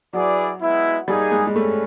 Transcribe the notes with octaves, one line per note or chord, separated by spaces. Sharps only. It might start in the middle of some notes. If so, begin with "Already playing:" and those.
F#3 E4 G#4 B4 D5
G#3 B3 E4
G3 A#3 D#4 G#4
G#3
G#3
A3 C#4